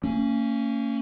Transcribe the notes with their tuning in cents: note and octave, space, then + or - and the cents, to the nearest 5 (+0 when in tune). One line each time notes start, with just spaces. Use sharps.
A#3 -40 C#4 +0